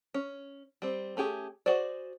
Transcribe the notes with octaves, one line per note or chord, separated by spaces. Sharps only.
C#4
G3 C4
A3 C#4 G4 G#4
F#4 G#4 C5 D5